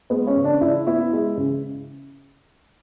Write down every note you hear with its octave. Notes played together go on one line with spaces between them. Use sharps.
G#3 B3 B4
C#4 C#5
C#3
D4 D5
C#3 E4 E5
B3 E4 E5
G#3
C#3